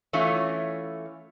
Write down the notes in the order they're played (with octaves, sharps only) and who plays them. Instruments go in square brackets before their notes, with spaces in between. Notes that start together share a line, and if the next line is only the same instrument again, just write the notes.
[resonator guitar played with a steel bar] E3 A3 C#4 F4